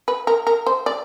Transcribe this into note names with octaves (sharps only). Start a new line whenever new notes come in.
B4
A#4
A#4
C5
D5